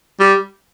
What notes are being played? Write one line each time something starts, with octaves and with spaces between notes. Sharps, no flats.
G3